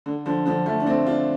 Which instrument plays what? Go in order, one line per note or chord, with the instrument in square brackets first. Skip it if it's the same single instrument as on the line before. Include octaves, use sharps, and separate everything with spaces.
[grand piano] D3
D3 F3
D3 F3
F3 A3
D4
A3 C4
D4 F4